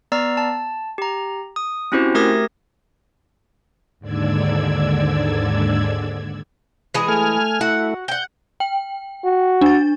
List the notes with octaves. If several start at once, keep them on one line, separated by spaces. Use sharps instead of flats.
B3 D5 A#5 E6 C7
A5
G4 A#5
D#6
C4 C#4 E4 F#4 G4 C5
A3 G4 A#4 D#6 G#6 A#6
D#2 G#2 D3 D5 E6 G#6
E3 G#3 G#4
A3 G#5 F6
A3 E4 F#4 F#5
F#5 G5 G6
G5
F#4
D4 A6